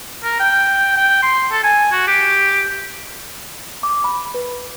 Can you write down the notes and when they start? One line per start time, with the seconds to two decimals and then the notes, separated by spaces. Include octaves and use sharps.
0.24 A#4
0.40 G5
0.97 G5
1.22 C6
1.52 A4
1.64 G#5
1.92 F#4
2.08 G4
3.83 D6
4.04 B5
4.34 B4